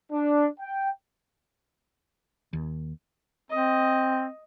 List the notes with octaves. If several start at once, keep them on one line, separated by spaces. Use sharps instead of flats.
D4
G5
D#2
C4 D#5